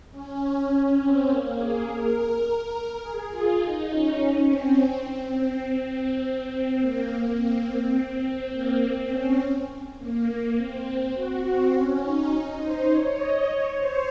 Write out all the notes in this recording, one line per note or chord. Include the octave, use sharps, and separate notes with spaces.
C#4
C4
A#3
G#4
A#4
G#4
F4
D#4
C#4
C4
C4
C4
C4
C4
A#3
C4
C4
A#3
C4
C#4
A#3
C4
F#4
C4
C#4
D#4
C5
C#5
D#5
C#5
C5